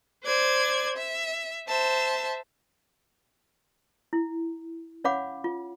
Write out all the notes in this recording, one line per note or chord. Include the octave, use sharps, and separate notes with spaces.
C5 D5 G#6
E5
C5 E5 A5
E4
C#4 C#5 F5 F#5 B5 D6
F4